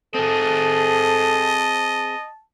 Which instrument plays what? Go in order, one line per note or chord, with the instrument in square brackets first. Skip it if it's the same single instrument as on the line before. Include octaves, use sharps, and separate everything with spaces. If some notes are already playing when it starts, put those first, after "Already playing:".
[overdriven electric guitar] C4 G#4 [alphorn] A4 [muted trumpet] D#5 [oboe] A5